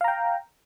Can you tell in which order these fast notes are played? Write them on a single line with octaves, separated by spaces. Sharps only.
F5 A#5 G5